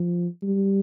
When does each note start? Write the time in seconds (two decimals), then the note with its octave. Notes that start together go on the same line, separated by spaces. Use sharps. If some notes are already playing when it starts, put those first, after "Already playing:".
Already playing: F3
0.42 G3